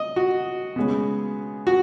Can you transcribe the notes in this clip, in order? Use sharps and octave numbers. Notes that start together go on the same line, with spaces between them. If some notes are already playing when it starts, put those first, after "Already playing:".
Already playing: D#5
F#4
C#3 G#3 B3
F#4